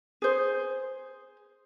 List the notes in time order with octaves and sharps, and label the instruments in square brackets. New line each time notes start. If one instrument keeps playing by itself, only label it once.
[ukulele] G#4 C5